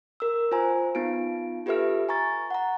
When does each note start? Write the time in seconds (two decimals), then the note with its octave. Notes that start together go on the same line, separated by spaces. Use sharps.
0.20 A#4 E6
0.52 F4 C5 G#5 A#5
0.95 B3 D#4 F4 D7
1.66 F4 G4 A4 B4 E5 F6
2.09 G#5 A#5 C#6 A6
2.51 F#5 A#5